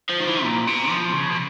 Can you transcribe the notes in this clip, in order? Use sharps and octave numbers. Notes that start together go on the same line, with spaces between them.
F3
D#3
E3
A#2
B2
F3
C#3
B2